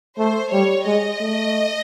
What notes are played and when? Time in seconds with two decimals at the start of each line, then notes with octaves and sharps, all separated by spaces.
0.17 A3 C5
0.51 G3 C#5
0.86 G#3 D#5
1.20 A3